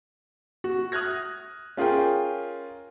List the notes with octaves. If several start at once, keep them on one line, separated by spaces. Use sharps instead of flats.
F#4
D#6 F6 F#6 G#6 A#6
C#4 F4 G#4 A#4 G5